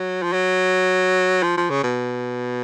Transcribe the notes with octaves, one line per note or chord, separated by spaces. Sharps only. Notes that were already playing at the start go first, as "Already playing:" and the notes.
Already playing: F#3
F3
F#3
F3
F3
C#3
B2